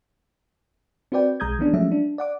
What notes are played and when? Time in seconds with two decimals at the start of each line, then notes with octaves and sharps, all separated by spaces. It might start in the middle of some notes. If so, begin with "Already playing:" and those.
1.12 C4 F#4 B4 D5 G5
1.40 B1 G#3 A#5 D#6 G6 G#6
1.59 E3 G#3 B3 C#4 D4
1.73 F3 F#3 G#3 A3 C#4 E5
1.92 D4
2.18 D5 F#5 D6